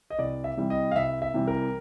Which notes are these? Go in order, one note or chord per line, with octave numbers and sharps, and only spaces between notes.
D#5
C2 D5
E5
C3 E3 G3
D#5
F5
C2 E5
E5
C3 E3 G3
A#4